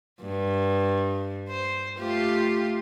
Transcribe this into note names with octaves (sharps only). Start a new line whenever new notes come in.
G2
C5
A3 F4 G4